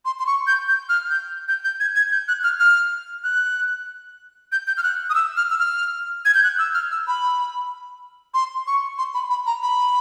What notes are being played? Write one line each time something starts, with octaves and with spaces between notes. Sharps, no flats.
C6
C6
C#6
G6
G6
F6
G6
G6
G6
G#6
G#6
G6
F#6
F6
F6
F#6
G6
G6
F6
F#6
D#6
E6
F6
E6
F6
G#6
G6
F#6
E6
F6
E6
B5
C6
C#6
C6
B5
B5
A#5
B5